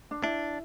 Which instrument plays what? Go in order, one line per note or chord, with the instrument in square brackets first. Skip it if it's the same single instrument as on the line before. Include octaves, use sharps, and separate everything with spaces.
[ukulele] D4
[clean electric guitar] D4 [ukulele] E4